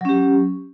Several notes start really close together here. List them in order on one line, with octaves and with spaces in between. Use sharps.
F#3 C#4 G4